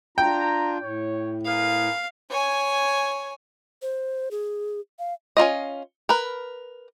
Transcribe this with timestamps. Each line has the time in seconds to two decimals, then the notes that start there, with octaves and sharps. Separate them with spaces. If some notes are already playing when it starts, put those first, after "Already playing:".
0.18 D4 F4 G5 A#5
0.82 A2 C#5
1.46 G#4 A#4 B4 F5
2.31 C#5 G#5
3.82 C5
4.31 G#4
4.99 F5
5.37 C#4 D#4 F4 D#5
6.09 A#4 B4